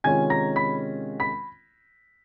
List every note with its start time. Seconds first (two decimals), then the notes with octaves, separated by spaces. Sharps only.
0.04 C3 D#3 G#3 C#4 F4 G#5 G#6
0.30 A#5 A#6
0.56 B5 B6
1.20 B5 B6